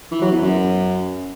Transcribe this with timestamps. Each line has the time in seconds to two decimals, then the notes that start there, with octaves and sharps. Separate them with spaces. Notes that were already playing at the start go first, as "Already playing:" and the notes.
0.11 E3
0.21 F#3
0.32 E2
0.42 F#2